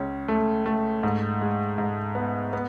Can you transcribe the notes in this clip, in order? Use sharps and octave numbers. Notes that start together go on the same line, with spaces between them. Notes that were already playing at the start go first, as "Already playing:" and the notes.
Already playing: C#2 C#4
A3
A3
G#2
G#3
G#2
B3
B3